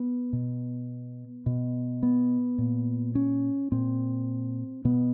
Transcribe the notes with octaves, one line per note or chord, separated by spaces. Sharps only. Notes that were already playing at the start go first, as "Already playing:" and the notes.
Already playing: B3
B2
B2
B3
A#2
C#4
A#2 C4
B2 B3